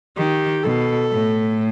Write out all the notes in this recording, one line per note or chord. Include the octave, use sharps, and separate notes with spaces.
D#3 G4
B2 A4
A2